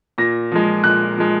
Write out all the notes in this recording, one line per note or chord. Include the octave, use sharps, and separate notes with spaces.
A#2 A#6
F3 G#3
A#2 F#6
F3 G#3